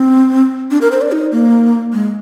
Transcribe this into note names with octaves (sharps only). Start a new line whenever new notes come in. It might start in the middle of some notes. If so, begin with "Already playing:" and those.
Already playing: C4
D4
A#4
C5
D5
D#4
A#3
G#3